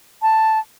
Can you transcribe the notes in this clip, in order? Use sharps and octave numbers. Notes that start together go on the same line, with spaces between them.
A5